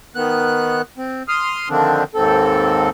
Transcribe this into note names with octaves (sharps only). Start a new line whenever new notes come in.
D#3 B3 F#6
C4
C6 D#6 F6
D3 D#3 F3 C4 D4
D#2 G#2 C4 A4